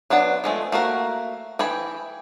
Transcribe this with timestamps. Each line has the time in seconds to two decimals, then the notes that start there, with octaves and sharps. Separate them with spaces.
0.10 F#3 B3 D4 F#5
0.44 F3 G#3 A3
0.72 A3 A#3 F#4 A#4
1.59 E3 G#4 G5 B5